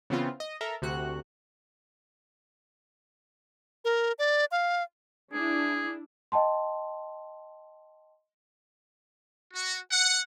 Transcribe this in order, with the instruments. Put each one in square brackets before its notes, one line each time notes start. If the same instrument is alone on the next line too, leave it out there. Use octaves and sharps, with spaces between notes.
[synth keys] C#3 E3 B3 C4 F4
D#5
A4 A#4 E5 A#5
D2 C3 F#4 F#6
[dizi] A#4
D5
F5
[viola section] D4 E4 [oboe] G#4
[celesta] D#5 G5 A5 C6
[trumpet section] F#4
F#5